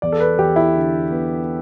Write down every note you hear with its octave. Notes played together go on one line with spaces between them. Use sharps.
E2 D5
A4
B4
E2 G4
E4
D3
B3